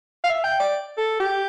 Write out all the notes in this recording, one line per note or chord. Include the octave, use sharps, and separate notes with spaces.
F5
E5
G5
D5
A4
G4